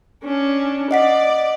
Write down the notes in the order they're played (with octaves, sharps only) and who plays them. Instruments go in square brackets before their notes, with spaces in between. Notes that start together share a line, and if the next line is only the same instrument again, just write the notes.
[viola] C#4 D4
[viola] D5 [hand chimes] D#5 F#5 B6